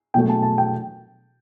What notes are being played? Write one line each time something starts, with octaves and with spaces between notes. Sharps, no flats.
B2 F#3 A3 G5
A5
A5
G5